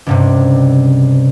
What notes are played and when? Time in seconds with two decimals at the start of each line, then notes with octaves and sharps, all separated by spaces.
0.06 C#2 G2 C3